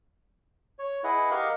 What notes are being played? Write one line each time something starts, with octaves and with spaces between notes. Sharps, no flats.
C#5
E4 G#4 B4 D#5 F#5
G4 A#4 D#5 F5 F#5